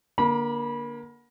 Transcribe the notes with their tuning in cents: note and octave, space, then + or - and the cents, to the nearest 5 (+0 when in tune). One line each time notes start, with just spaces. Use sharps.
D3 +0 A#3 +25 B5 -20